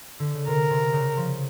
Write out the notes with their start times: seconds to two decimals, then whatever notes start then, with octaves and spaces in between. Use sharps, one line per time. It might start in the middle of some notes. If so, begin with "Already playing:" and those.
0.19 D3
0.34 C#3
0.47 C3 A#4
0.70 C3
0.93 C#3
1.17 F3